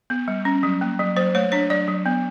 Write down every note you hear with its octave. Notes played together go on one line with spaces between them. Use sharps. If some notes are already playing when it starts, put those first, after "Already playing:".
B3
G3
C#4
F#3
A#3
F#3
F#3 C5
A3 C#5
D4 C#5
F#3 D5
F#3
B3